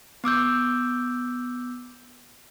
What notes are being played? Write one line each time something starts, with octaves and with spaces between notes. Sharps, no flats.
B3 D6 E6 G6